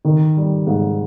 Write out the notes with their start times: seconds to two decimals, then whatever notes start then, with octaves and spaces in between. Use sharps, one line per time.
0.05 D#3
0.37 G3
0.67 G#2